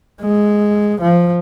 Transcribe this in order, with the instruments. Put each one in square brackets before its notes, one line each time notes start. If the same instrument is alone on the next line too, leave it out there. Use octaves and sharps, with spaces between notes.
[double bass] G#3
F3